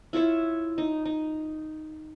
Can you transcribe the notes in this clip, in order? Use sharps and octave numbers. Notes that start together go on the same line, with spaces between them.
E4 F4 C#5 E5
D#4
D#4